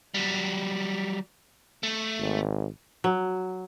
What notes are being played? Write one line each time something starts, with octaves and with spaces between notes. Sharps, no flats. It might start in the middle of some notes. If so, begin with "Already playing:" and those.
F#3 G3
A3
G#1
F#3